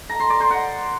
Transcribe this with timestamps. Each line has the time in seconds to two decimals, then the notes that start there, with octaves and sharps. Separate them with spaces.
0.09 A#5
0.20 C6
0.30 D5
0.40 C5
0.50 F#5